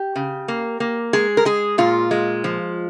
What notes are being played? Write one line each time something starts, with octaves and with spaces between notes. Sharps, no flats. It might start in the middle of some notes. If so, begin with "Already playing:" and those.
Already playing: G4
C#3
A#3
A#3
G#3 G#4
A#4
G#3 G#4
A#2 F4
G#3
F3